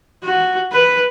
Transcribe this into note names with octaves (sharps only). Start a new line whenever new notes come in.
F#4
B4